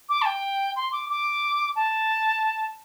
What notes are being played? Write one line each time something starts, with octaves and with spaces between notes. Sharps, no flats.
D6
A5
G5
C6
D6
D6
A5